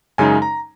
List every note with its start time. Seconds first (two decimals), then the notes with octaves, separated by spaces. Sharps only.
0.18 F#2 C#3 G#3 D#4 G#5
0.42 A#5